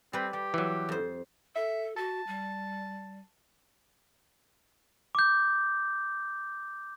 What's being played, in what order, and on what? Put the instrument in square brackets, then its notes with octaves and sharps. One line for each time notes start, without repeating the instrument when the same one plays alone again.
[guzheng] G3 B4 [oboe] C4
[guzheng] G3 [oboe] G4
[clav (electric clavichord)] E3 F#3
[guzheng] F2 C5
[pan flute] A4 [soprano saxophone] E5
[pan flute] F#4 [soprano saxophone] A5
[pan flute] G3
[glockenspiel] D6 G6